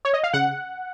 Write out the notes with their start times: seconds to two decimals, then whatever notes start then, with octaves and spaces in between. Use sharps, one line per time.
0.05 C#5
0.14 D#5
0.23 F5
0.33 C#3 F#5